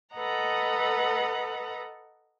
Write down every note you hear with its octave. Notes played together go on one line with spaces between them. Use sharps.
A4 B4 D#5 F#5 A#5